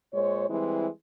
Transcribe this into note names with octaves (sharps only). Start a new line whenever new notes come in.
A#2 G#3 C5 C#5
E3 G3 G#3 C4 E4